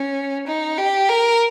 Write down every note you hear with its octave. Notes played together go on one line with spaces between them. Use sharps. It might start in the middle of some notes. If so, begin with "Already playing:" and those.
Already playing: C#4
D#4
G4
A#4